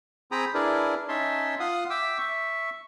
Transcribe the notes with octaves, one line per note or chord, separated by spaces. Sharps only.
C4 G#4 G5 A#5 B5 D#6
D4 E4 G#4 A#4 B4 D5
C#4 D#4 C#5 E5 A5 C6
F4 F5 F#5 D#6
E5 G5 D6 E6
E5 C#6